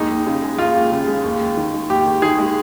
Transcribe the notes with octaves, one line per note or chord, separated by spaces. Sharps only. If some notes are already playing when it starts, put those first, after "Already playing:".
Already playing: D#2 G#3 D#4
D#2
C#3
G#3
D#2 F4
D#2
C#3
G#3
D#2
D#2
D#3
G#3
D#2 G4
D#2
D#3 G#4
G#3